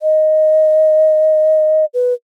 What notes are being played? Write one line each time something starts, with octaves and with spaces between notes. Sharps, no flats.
D#5
B4